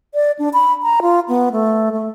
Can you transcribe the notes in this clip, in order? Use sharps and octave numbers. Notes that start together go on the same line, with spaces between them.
D5
D4
B5
A#5
F4
B3
A3
A3